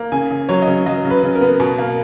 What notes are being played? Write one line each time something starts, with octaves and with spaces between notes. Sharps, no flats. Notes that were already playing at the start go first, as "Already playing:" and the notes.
Already playing: A#3
C#3 G#5
C#3
F#3 C#5
D#5
C#3 C#5
F#3 D#5
C#3
B4
C#3
A#4
B3
B2
A#3